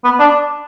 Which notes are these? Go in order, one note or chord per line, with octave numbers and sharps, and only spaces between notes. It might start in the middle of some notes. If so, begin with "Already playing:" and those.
B3
D4